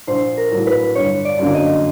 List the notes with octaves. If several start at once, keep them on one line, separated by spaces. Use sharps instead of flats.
A#1 C5
A#4
A2 F#3
B4
G1 C#5
D5
F#2 D3 F#3 A#3
D#5